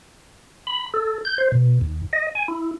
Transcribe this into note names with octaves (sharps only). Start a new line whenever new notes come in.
B5
A4
G6
C5
B2
D#2
D#5
G#5
E4